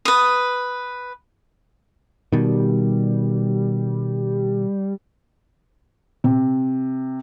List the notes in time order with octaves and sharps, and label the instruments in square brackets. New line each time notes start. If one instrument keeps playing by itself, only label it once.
[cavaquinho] B4 D#6
[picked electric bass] B2 D#3 [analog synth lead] G3
[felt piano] C3